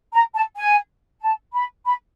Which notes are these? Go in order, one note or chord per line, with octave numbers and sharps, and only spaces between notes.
A#5
A5
G#5
A5
B5
B5